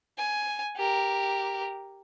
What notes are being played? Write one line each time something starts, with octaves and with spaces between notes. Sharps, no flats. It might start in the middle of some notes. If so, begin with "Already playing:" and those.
G#5
G4 A#4